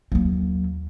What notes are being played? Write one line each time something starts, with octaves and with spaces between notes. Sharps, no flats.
D#2 F#3 A#3